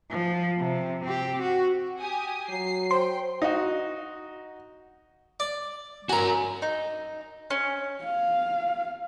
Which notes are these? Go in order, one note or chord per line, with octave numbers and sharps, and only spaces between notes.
F3
C3
C4 G4
F#4
G4 G#5 D#6
F#3 C7
C5 G5 C6
D#4 F#4
D5
F#4 A#4 G#5 A#5
D#4
C#4
F5